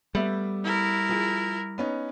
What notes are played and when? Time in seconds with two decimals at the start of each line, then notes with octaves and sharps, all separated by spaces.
0.15 G3 A3 B3 E5
0.64 E4 A#4
1.09 F3 G#4
1.78 B3 C#4 D#4